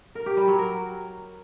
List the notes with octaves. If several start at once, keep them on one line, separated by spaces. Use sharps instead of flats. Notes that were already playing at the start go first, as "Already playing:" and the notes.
A#4
G4
G3
F#3
A#4